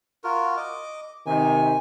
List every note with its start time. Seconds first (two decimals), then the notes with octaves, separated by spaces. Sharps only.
0.24 F4 F#4 A#4
0.57 D#5 D6
1.26 C3 D#3 D#4 G#5